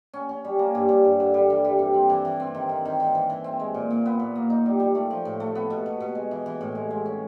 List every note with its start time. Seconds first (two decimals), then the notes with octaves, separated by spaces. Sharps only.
0.13 C#4
0.29 C#4
0.44 G3
0.59 A#3
0.75 G2
0.89 G2
1.05 G2
1.20 D3
1.34 G3
1.50 E3
1.65 G3
1.79 C3
1.94 C4
2.10 E3
2.25 E3
2.40 C4
2.55 D#3
2.69 D#3
2.85 D#3
3.00 D#3
3.15 E3
3.30 E3
3.44 C4
3.60 G#3
3.74 A#2
3.90 A#2
4.06 B3
4.20 A#2
4.36 A#3
4.50 D#4
4.66 G3
4.80 G3
4.95 A3
5.10 F3
5.25 A2
5.40 A3
5.55 B3
5.70 B2
5.86 B2
6.00 B2
6.15 G#3
6.31 E3
6.46 E3
6.61 A2
6.75 G#3
6.91 G#3
7.06 C#4